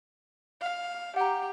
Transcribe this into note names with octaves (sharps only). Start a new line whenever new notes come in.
F5
G4 F#5 A#5